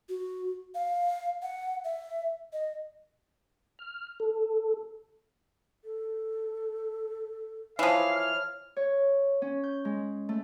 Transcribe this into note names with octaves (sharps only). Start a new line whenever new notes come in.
F#4
F5
F#5
E5
D#5
F6
A4
A4
E3 F3 C#5 F5
F6
C#5
C#4
G6
G#3
A3